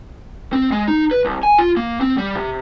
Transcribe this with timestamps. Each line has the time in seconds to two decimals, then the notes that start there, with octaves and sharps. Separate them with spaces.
0.53 C4
0.72 G#3
0.88 D#4
1.11 B4
1.25 C2
1.43 G#5
1.58 F4
1.77 A#3
2.01 C4
2.18 G3
2.35 C3